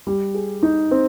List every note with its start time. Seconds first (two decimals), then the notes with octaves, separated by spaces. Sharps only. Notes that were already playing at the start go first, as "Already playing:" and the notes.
0.07 G3
0.34 G#4
0.63 D#4
0.91 C4